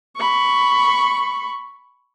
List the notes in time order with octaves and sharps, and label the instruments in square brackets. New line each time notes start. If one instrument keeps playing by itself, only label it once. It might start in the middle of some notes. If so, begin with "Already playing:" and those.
[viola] B5 C#6